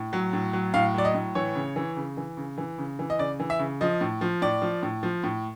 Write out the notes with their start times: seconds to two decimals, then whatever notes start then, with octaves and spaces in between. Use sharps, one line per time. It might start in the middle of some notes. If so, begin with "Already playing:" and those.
Already playing: A2
0.13 F#3
0.33 A2
0.53 F#3
0.74 A2 F5
0.94 F#3 D5
1.05 D#5
1.15 A2
1.35 E3 C#5
1.55 C#3
1.76 E3
1.96 C#3
2.17 E3
2.37 C#3
2.58 E3
2.78 C#3
2.99 E3
3.10 D#5
3.19 C#3 D5
3.40 E3
3.50 E5
3.59 C#3
3.81 F3 D#5
4.01 A2
4.21 F3
4.42 A2 D5
4.62 F3
4.83 A2
5.03 F3
5.24 A2